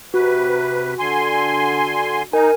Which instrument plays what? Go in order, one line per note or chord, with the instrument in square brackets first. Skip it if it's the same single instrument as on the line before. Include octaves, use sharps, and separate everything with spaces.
[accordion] C3 B4 [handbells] F#4
[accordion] D3 G#5 C6
[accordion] D#4 [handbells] A#4 G#5